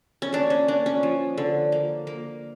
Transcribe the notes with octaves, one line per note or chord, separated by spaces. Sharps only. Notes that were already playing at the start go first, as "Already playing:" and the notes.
C#4
A#3 D4
C#4
A#3 D4
C#4
F3
D3
A#3
A#3